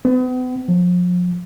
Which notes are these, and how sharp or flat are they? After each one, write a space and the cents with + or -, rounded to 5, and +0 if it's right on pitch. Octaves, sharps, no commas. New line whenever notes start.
B3 +40
F3 +35